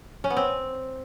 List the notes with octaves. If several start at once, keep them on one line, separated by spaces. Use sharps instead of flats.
C#4
B3
C4